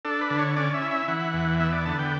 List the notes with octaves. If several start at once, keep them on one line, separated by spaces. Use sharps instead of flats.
D4 A4
B4
D3
C#5
C#4 D5
E5
E4
E5
E3 F#5
E2
B3 E5
D5
D3 A5
G5